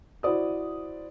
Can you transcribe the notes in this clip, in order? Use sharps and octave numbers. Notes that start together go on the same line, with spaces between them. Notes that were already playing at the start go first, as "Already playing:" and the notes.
E4 F#4 C5 D5 D#6